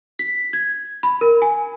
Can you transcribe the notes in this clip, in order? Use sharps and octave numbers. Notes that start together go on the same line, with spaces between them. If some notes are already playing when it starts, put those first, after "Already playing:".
B6
G#6
B5
A#4
G#5